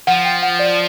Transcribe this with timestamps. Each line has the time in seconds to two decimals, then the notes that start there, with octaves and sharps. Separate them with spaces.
0.07 F3 F#5
0.25 G5
0.43 F#5
0.59 D5